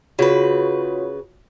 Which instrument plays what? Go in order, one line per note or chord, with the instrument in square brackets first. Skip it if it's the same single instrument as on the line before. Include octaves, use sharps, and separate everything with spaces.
[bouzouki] C#3 B4 [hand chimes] F4 F#4 C#5